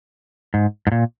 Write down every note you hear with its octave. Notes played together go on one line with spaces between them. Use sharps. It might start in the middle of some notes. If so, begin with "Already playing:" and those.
G#2
G#2
A#2